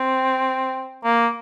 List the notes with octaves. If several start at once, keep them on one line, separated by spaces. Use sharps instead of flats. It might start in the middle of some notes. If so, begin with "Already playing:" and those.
Already playing: C4
A#3